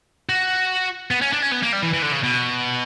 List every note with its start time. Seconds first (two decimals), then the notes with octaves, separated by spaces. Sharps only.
0.29 F#4
1.11 B3
1.21 C#4
1.32 D4
1.42 C#4
1.51 B3
1.63 A#3
1.73 G3
1.83 E3
1.93 E3
2.02 D3
2.13 C#3
2.23 B2